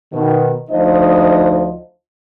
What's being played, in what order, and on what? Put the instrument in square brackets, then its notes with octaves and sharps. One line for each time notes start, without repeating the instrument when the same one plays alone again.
[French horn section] B2 D#3
D2 F3 D#4 D#5